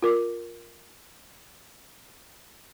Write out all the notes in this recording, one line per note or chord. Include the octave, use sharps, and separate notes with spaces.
F4 A#4 D6